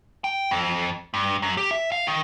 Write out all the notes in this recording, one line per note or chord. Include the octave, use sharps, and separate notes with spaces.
G5
F2
G2
F#2
G4
E5
F5
D#3